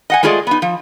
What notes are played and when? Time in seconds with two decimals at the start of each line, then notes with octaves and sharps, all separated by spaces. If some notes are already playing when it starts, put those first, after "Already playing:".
0.10 D#5 F#5 G#5
0.23 G#3 A3 F4 G#4 D5 D#5
0.47 B3 D#4
0.62 F3